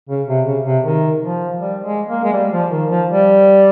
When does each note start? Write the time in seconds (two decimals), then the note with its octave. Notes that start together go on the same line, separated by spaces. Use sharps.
0.09 C#3
0.28 C3
0.47 C#3
0.65 C3
0.84 D#3
1.21 F3
1.59 G3
1.84 G#3
2.09 A#3
2.24 G#3
2.33 G3
2.52 F3
2.71 D#3
2.90 F3
3.09 G3